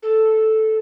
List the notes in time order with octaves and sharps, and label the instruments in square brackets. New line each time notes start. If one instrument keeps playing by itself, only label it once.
[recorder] A4